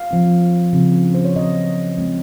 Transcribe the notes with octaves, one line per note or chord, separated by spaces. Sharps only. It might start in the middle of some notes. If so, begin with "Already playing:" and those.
Already playing: F5
F3 C4
C#3 F3 C4
C5
C#5
A#2 F#3 C4 D#5
A#2 G#3 C4